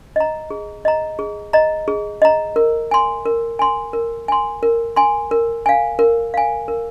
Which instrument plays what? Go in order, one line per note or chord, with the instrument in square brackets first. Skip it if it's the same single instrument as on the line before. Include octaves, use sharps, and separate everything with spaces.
[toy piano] D#5 A#5
G#4
D#5 A#5
G#4
D#5 A#5
G#4
D#5 A#5
A#4
G#5 C6
A#4
G#5 C6
A#4
G#5 C6
A#4
G#5 C6
A#4
F5 G#5
A#4
F5 G#5
A#4